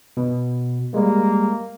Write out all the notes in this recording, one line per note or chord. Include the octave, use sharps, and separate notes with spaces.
B2
G3 G#3 A#3